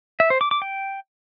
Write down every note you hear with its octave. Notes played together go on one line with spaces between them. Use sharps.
E5
C5
D6
D6
G5